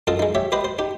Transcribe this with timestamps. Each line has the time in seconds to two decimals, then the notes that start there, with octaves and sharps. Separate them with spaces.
0.07 F#2 F4 A4 D#5
0.19 G#3 D#4
0.35 G4 C#5 E5
0.52 G4 B4 C5 D#5
0.65 C5
0.79 D#4 G4